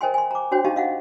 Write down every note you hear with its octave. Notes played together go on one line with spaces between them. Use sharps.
A#4 C5 D#5 G5 G#5 C6
G#5 C6
A#5 D6
D4 F#4 C5 C#5 G5
D#4 G4 D#5 F5 A5
D#5 F5 F#5